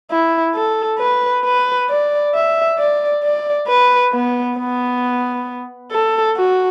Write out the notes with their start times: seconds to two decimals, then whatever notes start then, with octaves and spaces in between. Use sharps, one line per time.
0.11 E4
0.55 A4
0.99 B4
1.45 B4
1.89 D5
2.35 E5
2.79 D5
3.23 D5
3.69 B4
4.13 B3
4.58 B3
5.92 A4
6.37 F#4